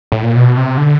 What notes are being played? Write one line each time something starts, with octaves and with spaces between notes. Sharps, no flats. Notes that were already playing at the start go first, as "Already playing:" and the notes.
A2
A#2
B2
C3
D3